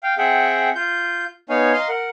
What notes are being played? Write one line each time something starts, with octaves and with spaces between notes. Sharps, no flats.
F5 G5
C4 G#4 E5 F#5 G5
F4 G6
B3 D#4 C#5 F5 G#5
D#5 F5 A#5 C6
A#4 F#5